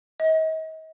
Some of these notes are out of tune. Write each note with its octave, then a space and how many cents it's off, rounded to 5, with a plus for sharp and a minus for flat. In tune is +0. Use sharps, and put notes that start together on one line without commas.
D#5 +40